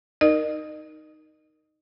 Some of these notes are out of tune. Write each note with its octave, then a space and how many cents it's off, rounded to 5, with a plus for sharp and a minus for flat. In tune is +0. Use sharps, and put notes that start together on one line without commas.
D#4 +0 A#4 +0 D#5 -35